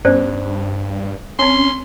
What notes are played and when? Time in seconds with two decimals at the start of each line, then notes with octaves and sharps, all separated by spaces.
0.05 G2 B3 C#4 C5 D5
1.39 C4 C#4 C#5 G#5 C6